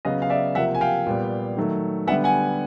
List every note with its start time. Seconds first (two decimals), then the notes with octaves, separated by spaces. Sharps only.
0.05 C#3 F#3 B3 D#5 F5
0.22 F5
0.30 D5 E5
0.55 C3 F3 A#3 E5 F#5
0.74 G#5
0.81 F5 G5
1.07 A#2 G3 B3
1.57 D#3 F#3 A3
2.07 D3 G3 B3 E5 F#5
2.24 F#5 G#5